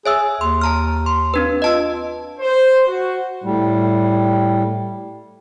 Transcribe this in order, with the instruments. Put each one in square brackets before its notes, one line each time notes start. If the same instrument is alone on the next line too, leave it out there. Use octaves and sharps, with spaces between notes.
[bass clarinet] G#4 [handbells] C#5 E5 E6
[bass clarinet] D#2 [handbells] C6
[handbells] A5 A#5 F6
C6
C4 D4 B4
[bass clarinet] F4 [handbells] D#5 A5 E6
[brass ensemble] C5
F#4
[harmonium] A2 G3